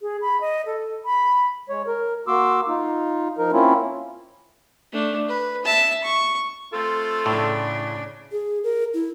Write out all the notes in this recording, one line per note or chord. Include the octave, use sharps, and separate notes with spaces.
G#4
B5
D#5
A4
B5
G#3 C#5
A#4
A#3 F#4 C6 D6 E6
D#4 F4
F3 D#4 A#4
A#3 C4 C#4 E4 F4
A3 D4
B4
E5 A5
C#6
A3 C4 F4 A4
A2 C#3 D4
G#4
A#4
E4